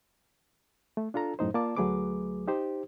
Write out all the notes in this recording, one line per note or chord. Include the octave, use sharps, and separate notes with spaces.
A3
D4 F4 A4 A#5
F#2 A2 D#4 C5
A#3 F4 D5 A5 D6
D2 F#3 A3 G#4 B4 D6
D#4 G4 C5